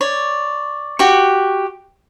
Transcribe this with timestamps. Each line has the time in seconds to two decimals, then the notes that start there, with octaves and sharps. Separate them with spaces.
0.01 C#5 D5
0.99 F#4 G4 C#6